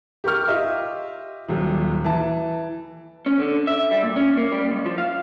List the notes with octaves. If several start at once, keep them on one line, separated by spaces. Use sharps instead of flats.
G4 A#4 C#6 F6
F4 G4 D#5 E5
D#1 D#2 F#3
E3 A5
C#4
D3
E5
G3
A#2
C#4
A#3
G3
C#2
F3
F5